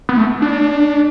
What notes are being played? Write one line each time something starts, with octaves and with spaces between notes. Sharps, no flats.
B3
A3
D4